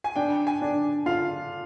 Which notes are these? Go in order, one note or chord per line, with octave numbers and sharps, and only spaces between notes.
G#5
D4 G5
G#5
D4
F4 F5